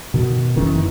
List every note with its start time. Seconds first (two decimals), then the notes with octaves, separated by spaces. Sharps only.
0.14 B2 D#3
0.56 F#1 D#3 E3 C#4